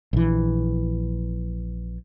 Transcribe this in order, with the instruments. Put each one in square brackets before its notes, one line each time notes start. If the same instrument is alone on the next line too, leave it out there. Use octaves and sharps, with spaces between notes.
[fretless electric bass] A#1 E3